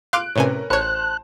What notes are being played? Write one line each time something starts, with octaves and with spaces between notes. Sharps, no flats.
F5 C6 D6 F#6 D7
A2 C3 C#4 A#4 B4 G#5
A1 C5 C#5 A5 F#6